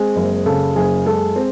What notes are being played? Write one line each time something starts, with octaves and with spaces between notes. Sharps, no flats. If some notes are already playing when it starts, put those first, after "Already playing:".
Already playing: G#3 C4
F#1
C#3 A4
F#1 G#4
G#3 A4
C4